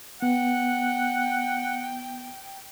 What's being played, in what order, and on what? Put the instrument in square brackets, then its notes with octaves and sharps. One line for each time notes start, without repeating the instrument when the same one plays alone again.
[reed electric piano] B3 [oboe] F#5 [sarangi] G5